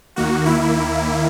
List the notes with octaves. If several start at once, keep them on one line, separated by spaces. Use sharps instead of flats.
D#2 D#3 A#3 F#4
E4